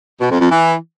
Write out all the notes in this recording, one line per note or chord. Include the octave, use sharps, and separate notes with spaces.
B2
F2
F2
E3